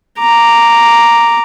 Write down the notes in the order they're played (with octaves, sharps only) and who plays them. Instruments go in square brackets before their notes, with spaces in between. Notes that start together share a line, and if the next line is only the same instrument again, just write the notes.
[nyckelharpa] A#5 D6